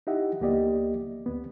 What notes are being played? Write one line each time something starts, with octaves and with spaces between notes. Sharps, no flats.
D#4 E4 G4 D#5 E5 F#5
C#2 A#3 B3 G4 D5 D#5
D2 B3